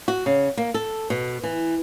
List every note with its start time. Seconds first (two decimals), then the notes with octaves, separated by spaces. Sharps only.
0.08 F#4
0.26 C#3
0.57 A#3
0.74 A4
1.10 B2
1.43 E3